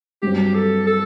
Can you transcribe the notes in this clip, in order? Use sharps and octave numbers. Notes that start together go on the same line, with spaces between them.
G2 F#3 C4 G4
A4
A4